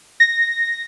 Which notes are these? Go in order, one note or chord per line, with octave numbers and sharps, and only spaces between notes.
A#6